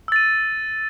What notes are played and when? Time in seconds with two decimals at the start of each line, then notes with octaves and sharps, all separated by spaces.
0.08 E6
0.12 A6
0.16 D#7